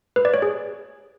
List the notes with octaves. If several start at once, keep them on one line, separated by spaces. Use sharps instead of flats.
B4
D5
C#5
G#4